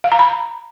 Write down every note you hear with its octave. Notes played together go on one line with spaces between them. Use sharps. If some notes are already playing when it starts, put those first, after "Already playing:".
F5
A#5
B5